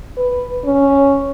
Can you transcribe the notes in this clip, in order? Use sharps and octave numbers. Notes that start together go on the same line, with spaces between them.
B4
C#4